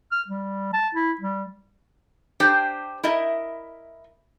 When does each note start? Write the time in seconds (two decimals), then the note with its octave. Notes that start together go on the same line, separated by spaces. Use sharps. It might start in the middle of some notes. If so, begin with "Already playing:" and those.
0.12 F6
0.28 G3
0.73 A5
0.95 E4
1.21 G3
2.40 D4 G4 C5 G5
3.03 E4 A#4 D#5 E5